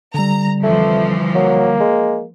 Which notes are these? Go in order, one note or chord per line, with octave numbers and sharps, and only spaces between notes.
D3 G3 A#5
F2 E3 F3 A3
F#3 A#3
G#3